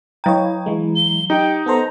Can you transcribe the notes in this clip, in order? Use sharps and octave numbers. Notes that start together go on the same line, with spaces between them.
F#3 C#5 D#5 G5 A#5
E3 G#3
G7
D#4 G4 G5
B3 A4 C5 A#5